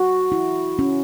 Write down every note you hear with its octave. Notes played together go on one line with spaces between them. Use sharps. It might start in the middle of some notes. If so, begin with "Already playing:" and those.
Already playing: F#4
E4
C#4